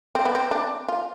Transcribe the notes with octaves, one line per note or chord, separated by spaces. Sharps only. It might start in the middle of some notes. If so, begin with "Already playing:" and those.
C4
B3
C4
D4
F4